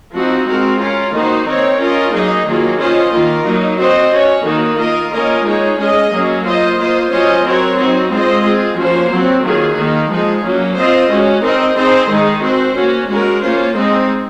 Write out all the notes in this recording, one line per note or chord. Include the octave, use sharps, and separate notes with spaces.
F3 C4 D#4 F#4
G#3 C4 F#4 A#4
C#4 F4 A#4
D#3 A#3 D#4 F#4 C5
C4 D#4 A#4 C#5
C#4 F4 A#4 D#5
F#3 A#3 D#4 G#4 D#5
D#3 F#3 A#3 F4 G#4
C#4 F4 C5 D#5
D#3 A#3 F4 A#4
F#3 A#3 D#4
C4 F#4 C5 D#5
C#4 F#4 C#5
D#3 A#3 D#4 F#4
A#3 F4 A#4 D#5
A#3 C#4 F4 A#4 D#5
G#3 D#4 G#4 C#5
G#3 C#4 G#4 D#5
F#3 A#3 C#4 G#4
A#3 F4 C5 D#5
A#3 F4 C5 D#5
F#3 C#4 F4 C5 D#5
F#3 C4 F#4 A#4 C#5
F#3 C4 D#4 F#4
G#3 C4 F4 C5 D#5
C4 F4 G#4
F3 A#3 C#4 F#4 C5
F#3 C4 F#4
D#3 F#3 A#3 F4 G#4
D#3 A#3 D#4
F3 G#3 D#4 G#4
F#3 A#3 C#4
C4 F4 C5 D#5
G#3 C#4 F#4
C4 D#4 A#4 D#5
C4 D#4 G#4 C5 D#5
D#3 G#3 D#4 G#4
C4 F#4 C5
A#3 C#4 F#4
G#3 C#4 F#4 A#4
A#3 C#4 F4 C5
G#3 C4 D#4